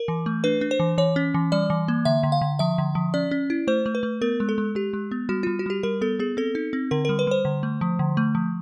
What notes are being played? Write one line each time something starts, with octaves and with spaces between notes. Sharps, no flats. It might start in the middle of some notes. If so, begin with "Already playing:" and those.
Already playing: A#4
E3
A3
D4 B4
D4
C5
E3
E3 C#5
C#4
E3
G3 D5
E3
A#3
D3 E5
D3
F5
D3
F3 E5
D3
F3
C#4 D5
C#4
E4
A3 C5
A3
B4
A3
B3 A#4
G#3
A4
G#3
G#3 G4
G#3
B3
G3 F#4
G3 F4
F#4
G3 G4
G3 A#4
B3 A4
B3 G#4
C4 A4
D#4
C4
D3 A#4
G3 A#4
B4
G3 C5
D3
A3
F3
D3
A3
F3